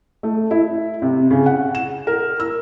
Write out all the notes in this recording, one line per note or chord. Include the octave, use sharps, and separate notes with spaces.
A3
E4
C3
C#3
F#5
E7
A#4
E6